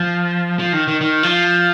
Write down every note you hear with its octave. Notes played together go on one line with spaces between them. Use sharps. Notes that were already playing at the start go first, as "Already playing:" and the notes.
Already playing: F3
F3
D#3
D#3
D#3
F3